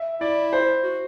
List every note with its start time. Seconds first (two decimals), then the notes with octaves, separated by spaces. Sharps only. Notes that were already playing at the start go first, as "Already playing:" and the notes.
Already playing: E5
0.21 E4 D5
0.53 C5
0.83 F#4